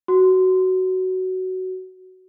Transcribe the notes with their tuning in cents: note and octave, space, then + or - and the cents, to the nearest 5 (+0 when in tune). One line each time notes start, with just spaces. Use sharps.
F#4 +15